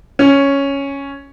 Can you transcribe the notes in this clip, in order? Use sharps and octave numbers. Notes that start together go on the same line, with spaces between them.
C#4